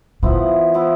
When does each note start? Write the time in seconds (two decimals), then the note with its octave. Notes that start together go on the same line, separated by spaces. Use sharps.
0.23 E3 F3 B3 E4
0.74 F3 B3 E4